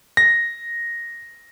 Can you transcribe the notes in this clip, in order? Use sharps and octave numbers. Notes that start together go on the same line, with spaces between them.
A#6